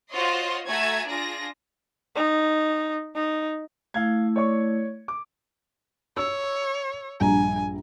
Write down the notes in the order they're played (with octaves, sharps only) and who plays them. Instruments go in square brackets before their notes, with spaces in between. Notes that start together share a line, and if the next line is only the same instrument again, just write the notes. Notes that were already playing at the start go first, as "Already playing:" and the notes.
[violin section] F4 F#4 C5 C#5 D#5 C6
A3 F#4 E5 G#5 A#5 G#6
D4 F4 G#4 A#6
[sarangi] D#4
D#4
[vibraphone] A3 E4 [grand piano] F5 G#6
[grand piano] C#5 D5 C#6
D6
[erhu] C#5 [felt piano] E6
[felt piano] A#1 G2 A#5 [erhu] G#5